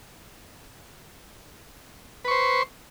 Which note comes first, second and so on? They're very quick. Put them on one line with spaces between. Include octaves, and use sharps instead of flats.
B4 C#6 C5